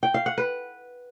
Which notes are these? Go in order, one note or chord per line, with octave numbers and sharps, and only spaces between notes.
G5
F5
F#5
B4